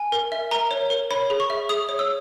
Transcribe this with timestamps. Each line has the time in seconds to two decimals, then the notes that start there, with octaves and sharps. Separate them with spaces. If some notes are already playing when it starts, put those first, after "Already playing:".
Already playing: G#5
0.12 A#4
0.32 E5
0.51 A#4 A#5
0.71 C#5
0.90 A#4
1.11 C#5 B5
1.30 G#4
1.40 C#6
1.50 E5
1.69 G#4 D#6
1.89 C#5
1.99 E6